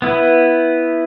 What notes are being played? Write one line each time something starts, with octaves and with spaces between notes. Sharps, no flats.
B3 E4 B4